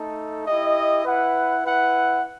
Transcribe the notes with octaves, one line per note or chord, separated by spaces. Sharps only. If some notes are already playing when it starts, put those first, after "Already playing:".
Already playing: A3 D#4 A4
E4 G4 D#5
E4 B4 F#5
E4 B4 F#5